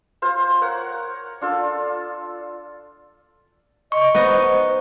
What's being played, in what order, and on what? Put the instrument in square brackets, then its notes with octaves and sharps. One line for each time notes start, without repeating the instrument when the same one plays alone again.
[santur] F4 C5 F5
A#4 C#5 F#5
D4 F4 A4
[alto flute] D#5 [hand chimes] C#6
[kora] B3 D#4 D#5 [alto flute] C5